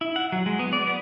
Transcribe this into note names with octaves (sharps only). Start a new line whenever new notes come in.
E4
F#5
F#3
G#3
B3
D5
B3